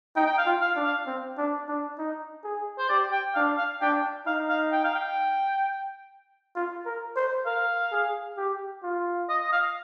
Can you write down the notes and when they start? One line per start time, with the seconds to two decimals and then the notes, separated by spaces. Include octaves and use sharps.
0.16 D#4 G5
0.26 G5
0.38 F5
0.46 F4
0.61 F5
0.76 D4
0.84 F5
1.07 C4
1.37 D4
1.68 D4
1.98 D#4
2.44 G#4
2.78 C5
2.89 G4 D5
3.12 G5
3.35 D4 F5
3.57 F5
3.81 D4 G5
4.26 D#4 F5
4.49 F5
4.72 G5
4.84 F5
4.95 G5
6.55 F4
6.86 A#4
7.16 C5
7.46 A#4 F5
7.92 G#4
8.37 G4
8.83 F4
9.29 D#5
9.44 D#5
9.52 F5